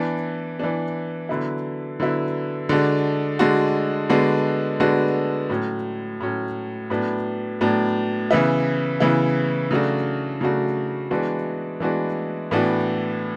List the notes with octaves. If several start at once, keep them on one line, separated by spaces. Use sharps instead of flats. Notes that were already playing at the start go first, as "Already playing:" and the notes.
Already playing: E3 B3 D4
E3 B3 D4
D3 F#3 B3 E4
D3 F#3 B3 E4
D3 G#3 D4 F#4
D3 G#3 D4 F#4
D3 G#3 B3 D4 F#4
D3 G#3 B3 D4 F#4
A2 F#3 C#4
A2 F#3 C#4
A2 F#3 B3 D4
A2 F#3 B3 D4
C#3 E3 B3 E4
C#3 E3 B3 E4
C#3 F#3 A3 D4 F#4
C#3 F#3 A3 D4 F#4
E3 G#3 B3 D4 F#4
E3 G#3 B3 D4 F#4
A2 E3 B3 D4 F#4